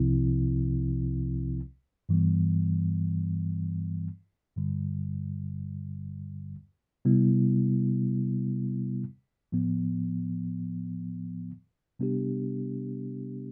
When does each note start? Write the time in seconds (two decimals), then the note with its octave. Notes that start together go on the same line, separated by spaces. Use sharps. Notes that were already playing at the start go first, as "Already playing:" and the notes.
Already playing: C2 C3 F3 C4 E4
2.09 G2 E3 G3 B3
4.56 G2 D3 G3
7.05 C3 G3 B3 E4
9.52 A2 F3 B3
11.99 C3 G3 B3 D4 G4